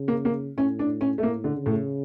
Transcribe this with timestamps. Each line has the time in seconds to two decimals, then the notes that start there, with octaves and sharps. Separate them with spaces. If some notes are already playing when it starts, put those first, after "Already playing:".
Already playing: C#3
0.08 A#3
0.25 A#3
0.57 A2 C#4
0.79 D4
1.01 C#4
1.18 A3
1.23 A2 A#3
1.44 D3
1.55 C#3
1.66 A2